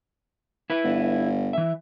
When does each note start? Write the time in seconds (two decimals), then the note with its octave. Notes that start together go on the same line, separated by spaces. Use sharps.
0.70 E4 B4
0.84 G1
1.53 E3 E5